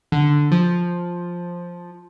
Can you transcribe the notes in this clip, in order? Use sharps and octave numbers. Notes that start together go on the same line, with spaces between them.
D3
F3